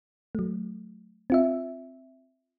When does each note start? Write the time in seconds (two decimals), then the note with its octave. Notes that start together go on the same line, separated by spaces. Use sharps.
0.35 F#3 A3
1.30 C4 F4 E5